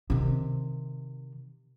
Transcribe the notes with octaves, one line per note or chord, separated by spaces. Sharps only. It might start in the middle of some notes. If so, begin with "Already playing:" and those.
C3 D#3